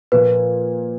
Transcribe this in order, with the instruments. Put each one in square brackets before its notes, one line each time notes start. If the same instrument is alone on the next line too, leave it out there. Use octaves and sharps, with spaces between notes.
[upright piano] A#2 F3 A#3 [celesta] B4